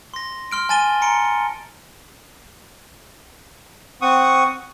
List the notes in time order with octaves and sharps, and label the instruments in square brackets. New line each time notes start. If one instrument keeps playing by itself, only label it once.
[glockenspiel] C6 A#6
C6 F6 D7
G#5 A5 A6 D#7 G7
A#5 C6 C#7 D7
[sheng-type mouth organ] C4 F#5 C#6 D#6